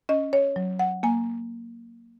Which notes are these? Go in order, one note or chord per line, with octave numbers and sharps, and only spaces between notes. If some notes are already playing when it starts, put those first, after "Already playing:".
C#4 D#5
C#5
F#3
F#5
A#3 G#5